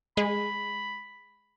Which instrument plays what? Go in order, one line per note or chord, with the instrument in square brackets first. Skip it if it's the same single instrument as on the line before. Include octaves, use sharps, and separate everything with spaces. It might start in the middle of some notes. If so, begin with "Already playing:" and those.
[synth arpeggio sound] G#3 [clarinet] B5